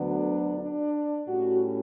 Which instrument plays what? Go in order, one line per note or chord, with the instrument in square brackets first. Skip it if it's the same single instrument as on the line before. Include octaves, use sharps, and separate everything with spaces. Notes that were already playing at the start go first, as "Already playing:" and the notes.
Already playing: [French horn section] D2 D3 F#3 B3 D4
D4
A2 G3 C#4 F#4